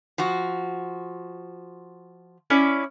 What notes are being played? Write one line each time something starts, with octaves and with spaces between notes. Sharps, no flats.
F3 F#4
C#4 E4 D5